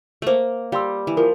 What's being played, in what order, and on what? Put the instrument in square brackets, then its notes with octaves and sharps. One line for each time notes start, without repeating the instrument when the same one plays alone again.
[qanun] A3 A#3 [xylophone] C5
[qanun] G3 [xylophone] F5 C6 E6
[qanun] E3
[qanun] F3 [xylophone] A#4